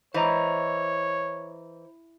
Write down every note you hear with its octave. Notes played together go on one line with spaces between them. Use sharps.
E3 C5 C#5 D#5 A#5